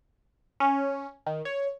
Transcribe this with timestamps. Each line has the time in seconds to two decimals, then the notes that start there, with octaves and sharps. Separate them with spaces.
0.60 C#4
1.26 D#3
1.45 C#5